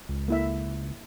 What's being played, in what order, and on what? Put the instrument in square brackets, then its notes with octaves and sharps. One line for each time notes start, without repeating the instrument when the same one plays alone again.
[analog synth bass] C#2
[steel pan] A#3 E4 E5